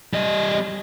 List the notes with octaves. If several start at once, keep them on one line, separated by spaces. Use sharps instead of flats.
G3 D#5